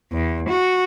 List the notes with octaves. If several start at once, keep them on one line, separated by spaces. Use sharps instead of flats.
E2
F#4